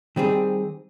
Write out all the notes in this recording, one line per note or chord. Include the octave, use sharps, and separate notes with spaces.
D#3 G3 C4 G#4